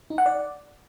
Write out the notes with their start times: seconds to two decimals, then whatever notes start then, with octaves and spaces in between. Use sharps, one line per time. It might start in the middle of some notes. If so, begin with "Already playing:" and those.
0.10 D#4
0.18 F#5
0.26 D5